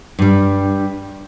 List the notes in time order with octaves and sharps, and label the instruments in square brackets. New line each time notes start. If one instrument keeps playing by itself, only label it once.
[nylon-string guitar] G2 G3